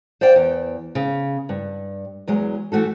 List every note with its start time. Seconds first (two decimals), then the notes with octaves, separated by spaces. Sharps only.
0.21 C5 D5 F5 G5
0.36 E2
0.95 C#3
1.49 G2
2.27 E2 F#3 G#3
2.72 E3 A3 F#4 A4